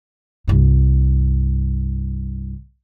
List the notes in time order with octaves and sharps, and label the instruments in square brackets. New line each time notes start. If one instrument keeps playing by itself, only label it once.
[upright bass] C2 G2